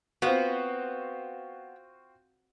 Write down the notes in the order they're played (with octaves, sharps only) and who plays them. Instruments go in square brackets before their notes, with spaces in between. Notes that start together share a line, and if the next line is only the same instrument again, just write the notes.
[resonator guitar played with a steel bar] B3 [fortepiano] C4 F4 F#4